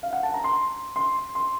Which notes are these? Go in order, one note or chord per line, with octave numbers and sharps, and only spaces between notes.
F5
F#5
A5
A#5
C6
C6
C6